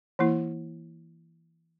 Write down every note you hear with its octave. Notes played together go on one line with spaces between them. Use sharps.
E3 A#3 E4